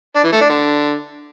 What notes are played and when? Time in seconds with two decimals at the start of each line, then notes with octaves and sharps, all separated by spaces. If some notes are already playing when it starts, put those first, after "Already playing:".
0.16 D4
0.24 E3
0.33 A3
0.41 D4
0.50 D3